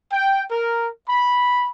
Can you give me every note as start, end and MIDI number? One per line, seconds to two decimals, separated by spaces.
0.12 0.43 79
0.51 0.89 70
1.08 1.71 83